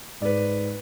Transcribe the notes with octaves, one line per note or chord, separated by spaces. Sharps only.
G#2 B4 D5